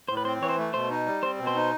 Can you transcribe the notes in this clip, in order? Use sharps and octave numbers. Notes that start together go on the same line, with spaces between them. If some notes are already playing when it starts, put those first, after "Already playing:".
A2 C5
B4
C4 C5
E3 C#5
C5
A3
B2 C5
D#4
G3
C4 C5
B2
C5
D#4